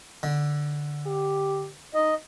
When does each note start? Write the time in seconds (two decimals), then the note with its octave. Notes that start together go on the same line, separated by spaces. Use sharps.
0.23 D3
1.06 G4
1.94 D#4 D#5